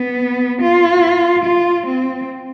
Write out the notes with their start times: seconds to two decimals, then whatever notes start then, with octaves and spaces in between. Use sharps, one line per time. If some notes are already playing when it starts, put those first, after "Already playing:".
Already playing: B3
0.61 F4
1.45 F4
1.87 C4